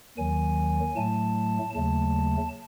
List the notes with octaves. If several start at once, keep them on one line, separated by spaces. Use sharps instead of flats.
D#2 D#3 F#3 G#5
A2 F#3 A3 A5
D#2 C#3 F#3 A3 A5